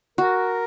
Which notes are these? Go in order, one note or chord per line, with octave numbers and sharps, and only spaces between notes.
F#4 A#4